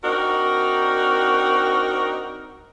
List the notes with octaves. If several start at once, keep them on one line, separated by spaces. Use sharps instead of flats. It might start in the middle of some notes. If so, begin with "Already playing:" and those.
C4 D4 D#4 F#4 A#4